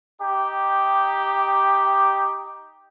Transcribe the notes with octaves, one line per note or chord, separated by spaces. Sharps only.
D#4 G4